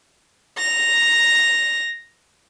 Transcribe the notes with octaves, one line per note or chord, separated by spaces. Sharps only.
A#6 F7